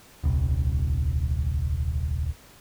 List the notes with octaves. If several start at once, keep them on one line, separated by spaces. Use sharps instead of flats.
D#1 C2